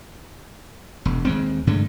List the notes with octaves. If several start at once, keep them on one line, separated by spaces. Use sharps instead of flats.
E1
D#2 G#3 C4
G2 D3 G#3 A3